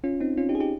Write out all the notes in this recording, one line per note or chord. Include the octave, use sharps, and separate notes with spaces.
C#4 F4
C4 D#4
C#4 F4
D#4 G4
G#4
D#4 G4